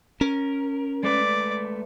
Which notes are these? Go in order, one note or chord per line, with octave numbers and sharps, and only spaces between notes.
C#4 A#4
G#3 A3 B4 D5